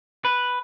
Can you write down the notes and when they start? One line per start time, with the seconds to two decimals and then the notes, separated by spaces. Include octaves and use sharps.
0.25 B4